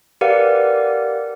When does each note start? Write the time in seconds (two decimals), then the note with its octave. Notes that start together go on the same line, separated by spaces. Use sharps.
0.21 G4 A#4 B4 D5 F5 F#5